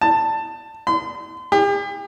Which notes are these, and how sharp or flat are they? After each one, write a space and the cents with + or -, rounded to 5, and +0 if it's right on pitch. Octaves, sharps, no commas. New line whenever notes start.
A5 +15
C6 -35
G4 +40